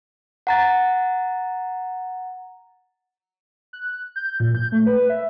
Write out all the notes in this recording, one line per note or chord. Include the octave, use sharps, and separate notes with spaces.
F#5 A#5 A6
F#6
G6
A#2
G6
A3
B4
E5